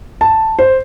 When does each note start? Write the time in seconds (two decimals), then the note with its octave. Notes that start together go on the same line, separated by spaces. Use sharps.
0.21 A5
0.59 C5